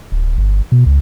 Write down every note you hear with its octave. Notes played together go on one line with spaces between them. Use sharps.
D1
G1
B2
C#2